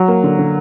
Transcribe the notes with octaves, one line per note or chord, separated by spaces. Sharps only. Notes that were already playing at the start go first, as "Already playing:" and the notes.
Already playing: F#3
A#3
D3
D3